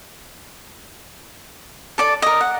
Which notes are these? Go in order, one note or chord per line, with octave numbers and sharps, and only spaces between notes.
A4 D5 A5
A#4 D#5
F#5